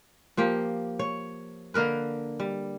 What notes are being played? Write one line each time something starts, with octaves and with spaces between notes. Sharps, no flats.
F3 A#3 G4
C#5
D3 A#3 A#4 B4
G3